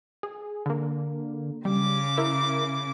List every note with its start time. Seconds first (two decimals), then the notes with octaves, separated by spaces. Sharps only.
0.23 G#4
0.66 D3 A#3
1.65 C#3 G3 D6
2.17 E4 A#4 E5